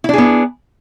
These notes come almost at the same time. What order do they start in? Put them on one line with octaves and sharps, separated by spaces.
E4 D4 G#4 B3